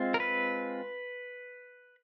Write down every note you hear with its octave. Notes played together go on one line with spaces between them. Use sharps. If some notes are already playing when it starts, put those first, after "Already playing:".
Already playing: G#3 C4 F4
A#4
B4